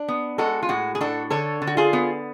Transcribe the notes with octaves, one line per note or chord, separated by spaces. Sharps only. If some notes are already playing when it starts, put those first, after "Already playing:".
Already playing: D4
B3
G#3 F#4 A4
F4
A2 F#4
G#4
D4 F#4 A4
D3 A4 C#5
D3
F#4
F4 G#4
B3